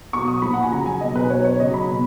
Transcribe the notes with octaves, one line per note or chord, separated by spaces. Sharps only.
B2 F#3 C#6
D#6
A#2 F3 B5
F#5
G#5
C#3 F#3 A#5
G#5
B2 F#3 D#5
B4
B2 F#3 C#5
C#5
C#3 F#3 D#5
B5
B2